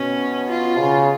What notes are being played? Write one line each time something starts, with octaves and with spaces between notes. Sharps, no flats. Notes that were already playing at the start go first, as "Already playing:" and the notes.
Already playing: B2 C#4
F4
C#3